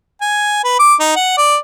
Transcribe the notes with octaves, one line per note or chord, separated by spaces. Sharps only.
G#5
B4
D6
D#4
F#5
D5